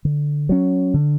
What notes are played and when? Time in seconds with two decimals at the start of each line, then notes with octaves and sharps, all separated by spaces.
0.05 D3
0.49 F#3 C#4
0.94 D3